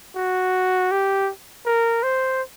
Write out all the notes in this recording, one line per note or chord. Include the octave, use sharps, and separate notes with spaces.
F#4
G4
A#4
C5